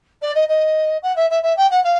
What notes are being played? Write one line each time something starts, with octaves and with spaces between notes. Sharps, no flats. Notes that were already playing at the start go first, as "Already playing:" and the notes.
D5
D#5
D#5
F#5
E5
E5
E5
G5
F#5
F5